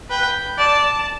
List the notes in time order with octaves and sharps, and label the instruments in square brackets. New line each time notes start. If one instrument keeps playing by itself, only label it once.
[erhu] B4 [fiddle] G5
[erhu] D5 [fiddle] A5